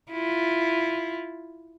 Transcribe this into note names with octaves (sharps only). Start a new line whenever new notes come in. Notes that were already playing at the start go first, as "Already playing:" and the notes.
E4 F4